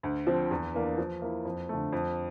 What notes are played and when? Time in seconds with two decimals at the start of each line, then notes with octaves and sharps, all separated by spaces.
0.03 D2
0.27 D3 F3 C4
0.51 E2
0.74 E3 A#3 D4
0.98 F3
1.22 A#3 E4
1.45 F2
1.69 D3 A3
1.93 F2